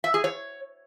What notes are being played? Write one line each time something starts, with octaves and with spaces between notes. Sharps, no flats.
E5
G#4
C#5